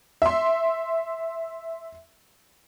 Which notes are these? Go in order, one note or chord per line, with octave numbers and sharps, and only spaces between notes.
E5 C6